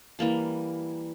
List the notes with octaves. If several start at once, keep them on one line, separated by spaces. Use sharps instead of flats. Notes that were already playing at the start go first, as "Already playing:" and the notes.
E3 G3 A#3 A5